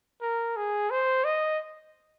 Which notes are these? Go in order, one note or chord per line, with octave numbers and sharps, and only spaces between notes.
A#4
G#4
C5
D#5